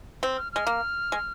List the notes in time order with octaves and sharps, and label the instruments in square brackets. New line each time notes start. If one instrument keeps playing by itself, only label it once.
[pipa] C4
[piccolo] F6
[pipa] G#3 [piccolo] F6
[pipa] A#3
G#3